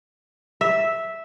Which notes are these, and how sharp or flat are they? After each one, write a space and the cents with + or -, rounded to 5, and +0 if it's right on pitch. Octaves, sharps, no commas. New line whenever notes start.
E5 -5